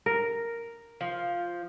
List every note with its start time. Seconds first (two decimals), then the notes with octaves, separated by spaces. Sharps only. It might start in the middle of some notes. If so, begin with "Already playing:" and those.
0.06 A#4
1.01 F3